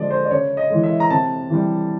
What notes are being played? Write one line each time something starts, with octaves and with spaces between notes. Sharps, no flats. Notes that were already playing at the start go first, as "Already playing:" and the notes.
Already playing: D3 F3 G#3 D5 D#5
C5
D5
C#3 C#5
D#5
E3 G#3
E5
A#5
C3 A5
E3 G3